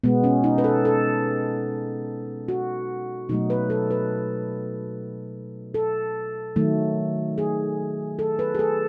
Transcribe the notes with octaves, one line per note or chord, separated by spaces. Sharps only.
B2 G#3 B3
C#4
D#4
B4
A4
A4
F#4
B2 F#3 A3 D#4
B4
A4
B4
A4
D#3 F#3 A3
G#4
A4
B4
G#4
A4